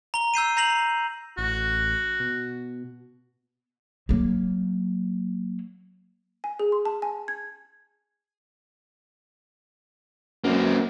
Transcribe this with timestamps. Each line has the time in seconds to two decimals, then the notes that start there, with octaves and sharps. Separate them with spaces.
0.14 A#5 G7
0.34 E6 G6 C7 D#7
0.57 A#5 G6 A#6 C7 F7 F#7
1.38 A1 F#4
2.20 B2
4.09 F#3 A#3
6.44 G#5
6.60 G#4
6.72 C6
6.85 A5
7.02 G#5
7.28 G#6
10.44 F#2 A#3 C4